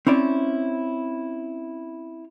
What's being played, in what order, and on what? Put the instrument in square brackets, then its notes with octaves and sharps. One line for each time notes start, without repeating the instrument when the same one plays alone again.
[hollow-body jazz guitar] C4 C#4 E4 D5